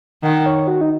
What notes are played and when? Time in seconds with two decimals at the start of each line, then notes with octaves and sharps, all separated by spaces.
0.23 D#3 F#5
0.46 C#5
0.67 F#4
0.81 D#4